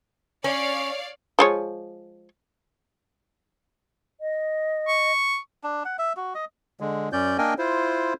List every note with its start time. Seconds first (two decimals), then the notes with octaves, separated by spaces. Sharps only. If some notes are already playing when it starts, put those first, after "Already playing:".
0.44 C#4 C#5 D5 F5
1.39 F3 G#3 C#5
4.21 D#5
4.88 C#6
5.63 D4
5.85 F#5
5.99 E5
6.17 F#4
6.35 D#5
6.80 D3 G#3
7.13 F#2 C#4 D5 G6
7.38 A#3 D4 A#4 D#5 G5 G#5
7.58 E4 F4 C5